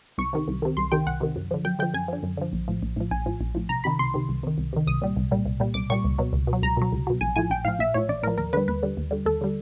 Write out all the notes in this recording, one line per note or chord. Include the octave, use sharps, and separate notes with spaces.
C2 C#6
C3 D#3
C2
C3 D#3
C2 C6
C3 D#3 G5
C2 F#5
C3 D#3
F#2
D3 F3
F#2 G5
D3 F3 G5
F#2 G#5
D3 F3
F#2
D3 F3
A#1
A2 F3
A#1
A2 F3
A#1 G#5
A2 F3
A#1
A2 F3
C2 A#5
C3 D#3 B5
C2 C6
C3 D#3
C2
C3 D#3
C2
C3 D#3
C2 D#6
A#2 G3
C2
A#2 G3
C2
A#2 G3
C2 D6
A#2 G3 C#6
C#2
B2 F#3
C#2
B2
F#3
C#2 A#5
B2 F#3
C#2
B2 F#3
A#1 G#5
A2 F3 G#5
A#1 G5
A2 F3 F5
A#1 E5
A2 F3 C#5
A#1 D5
A2 F3 A#4
D#2 A#4
D3 G3 B4
D#2 B4
D3 G3
D#2
D3 G3
D#2 A4
D3 G3